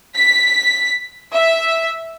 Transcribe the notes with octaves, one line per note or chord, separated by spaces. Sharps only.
B6
E5